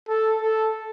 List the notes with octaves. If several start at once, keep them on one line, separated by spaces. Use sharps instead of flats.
A4
A4